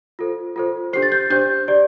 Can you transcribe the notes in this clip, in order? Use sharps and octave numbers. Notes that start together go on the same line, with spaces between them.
F4 A4 C5
F4 A4 C5
D4 G4 C5 C7
A6
G6
D4 G4 C5 G6
G4 D5